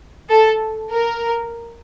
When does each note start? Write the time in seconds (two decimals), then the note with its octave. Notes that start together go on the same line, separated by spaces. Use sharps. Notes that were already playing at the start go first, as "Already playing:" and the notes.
0.30 A4
0.92 A#4